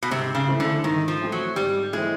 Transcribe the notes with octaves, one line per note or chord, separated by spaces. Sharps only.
B2
G#2 C3
C#3
E3 A3 C4 E4
D3
G#2 D#3
F3
E3 A3 C4 E4
F#3
G#2 G3
E3 G#3 A3 C4 E4